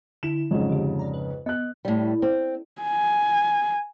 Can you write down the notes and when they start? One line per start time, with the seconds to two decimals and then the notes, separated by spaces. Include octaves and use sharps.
0.23 D3 E4 E7
0.51 F2 G#2 C#3 F#3
0.69 D3 G4
0.99 D5 A#5
1.13 B4
1.46 B3 D#5 F#6
1.85 A2 G3
2.22 C4
2.81 G#5